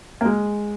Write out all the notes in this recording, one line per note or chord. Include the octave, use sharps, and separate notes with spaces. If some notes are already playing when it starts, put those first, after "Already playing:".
A#3
G#3